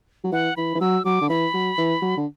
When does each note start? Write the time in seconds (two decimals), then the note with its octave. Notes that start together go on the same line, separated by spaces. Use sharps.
0.24 F#3
0.32 E3 F#5
0.57 E3 B5
0.75 E3
0.81 F#3 E6
1.05 F#3 D6
1.21 D3
1.29 E3 B5
1.54 F#3
1.78 E3
2.02 F#3
2.17 D3